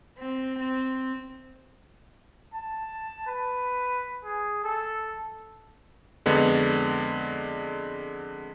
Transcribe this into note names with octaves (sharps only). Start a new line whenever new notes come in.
C4
C4
A5
B4
G#4
A4
F2 D3 G#3 B3